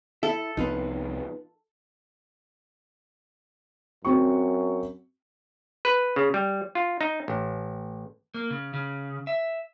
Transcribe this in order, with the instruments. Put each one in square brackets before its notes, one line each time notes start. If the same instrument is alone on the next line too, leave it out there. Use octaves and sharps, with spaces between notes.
[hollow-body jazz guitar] E4 E5 [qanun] A4
[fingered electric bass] C2 F3 B3 [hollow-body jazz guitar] D#4 F4 B4
[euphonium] F#2 [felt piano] C4 F#4 C#6
[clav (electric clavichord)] B4
C#3
G3
F4
D#4
A1
[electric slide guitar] A#3
C#3
C#3
E5